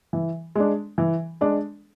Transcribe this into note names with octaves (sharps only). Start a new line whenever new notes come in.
E3
G#3 D4
E3
G#3 D4